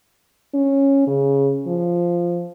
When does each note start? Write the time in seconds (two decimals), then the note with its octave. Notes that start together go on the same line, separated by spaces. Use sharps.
0.54 C#4
1.07 C#3
1.67 F3